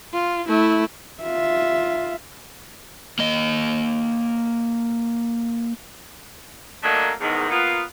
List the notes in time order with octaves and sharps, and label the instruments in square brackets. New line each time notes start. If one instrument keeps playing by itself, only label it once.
[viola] F4
A3 E4
[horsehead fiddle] F4 E5
[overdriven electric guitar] A#3 D#5
[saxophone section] F#3 A3 A#3 D4 A4 D#5
E2 G#2 D#3
A#3 B3 F4